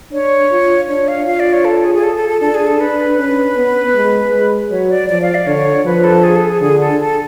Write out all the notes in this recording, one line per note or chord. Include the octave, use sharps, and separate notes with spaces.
D4 C#5
F4
D4 C#5
F5
F4 F5
D5
C#5
A4
G#4
G#4
A4
A4
A4
D4 A4
G#4
A4
D4 B4
C#4 B4
B3
G#3
G#3
F#3 C#5
D5
F3 D5
F5
D5
D3 C#5
F3 B4
A4
G#4
A4
G#4
D3 G#4
A4
A4